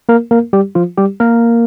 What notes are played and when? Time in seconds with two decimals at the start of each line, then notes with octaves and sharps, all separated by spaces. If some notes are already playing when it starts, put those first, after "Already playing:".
0.09 A#3 A#4
0.31 A#3 A#4
0.53 G3 G4
0.75 F3 F4
0.98 G3 G4
1.20 A#3 A#4